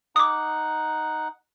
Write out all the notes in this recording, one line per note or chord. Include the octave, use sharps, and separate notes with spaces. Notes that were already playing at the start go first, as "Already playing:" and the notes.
D#4 F#5 D6 D#6